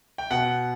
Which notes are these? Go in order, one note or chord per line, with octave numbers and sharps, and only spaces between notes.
G5
B2 F#5